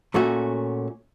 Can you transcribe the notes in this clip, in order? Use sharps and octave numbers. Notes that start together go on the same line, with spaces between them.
A#2 A3 C#4 F#4